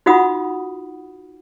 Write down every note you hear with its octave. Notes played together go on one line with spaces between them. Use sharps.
D#4 F4 F#4 F#5 B5 D#6